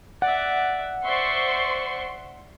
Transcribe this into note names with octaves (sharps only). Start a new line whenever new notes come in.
D5 E5 F#5
C5 D5 E5 C6 C#6